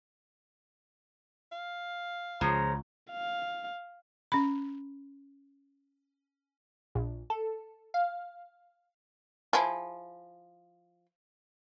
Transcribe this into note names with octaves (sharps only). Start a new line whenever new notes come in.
F5
C#2 C#3 F3 A#5
F5
C#4 B5
A#1
A4
F5
F3 E4 G#4